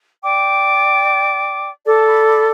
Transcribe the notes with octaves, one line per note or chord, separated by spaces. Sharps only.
D5 G5 D6
A4 D5 A5
B5
B5